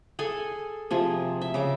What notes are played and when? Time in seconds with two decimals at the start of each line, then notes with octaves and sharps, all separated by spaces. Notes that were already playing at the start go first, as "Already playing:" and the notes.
0.19 G#4 A4 G#5
0.91 C3 F3 G#4
1.42 E5
1.54 C#3 D6